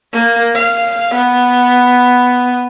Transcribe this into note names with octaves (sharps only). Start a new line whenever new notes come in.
A#3
F5
B3